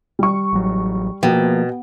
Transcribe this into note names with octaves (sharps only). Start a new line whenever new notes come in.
G3 C#6
A1 F#3
B2 F3 A#3 G5